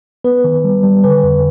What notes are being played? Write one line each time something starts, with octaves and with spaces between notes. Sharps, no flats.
B3 B4
D#3
G3
G3
D3 B4
F2